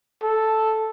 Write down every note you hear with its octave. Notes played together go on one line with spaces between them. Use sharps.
A4